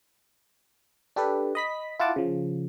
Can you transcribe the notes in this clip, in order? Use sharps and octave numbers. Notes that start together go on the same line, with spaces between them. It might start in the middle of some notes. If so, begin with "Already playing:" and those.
D4 G4 A4 B4
D#5 B5 B6
E4 F4 F#5 A5 D6
C#3 F3